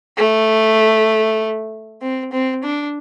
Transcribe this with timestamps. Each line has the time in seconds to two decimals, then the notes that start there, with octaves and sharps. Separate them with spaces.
0.17 A3
2.02 C4
2.32 C4
2.63 D4